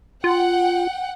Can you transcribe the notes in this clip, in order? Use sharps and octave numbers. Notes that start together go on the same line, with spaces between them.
F4 F#5 G5